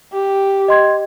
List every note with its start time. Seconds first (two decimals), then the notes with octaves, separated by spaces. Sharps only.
0.13 G4
0.68 D#5 C6 G#6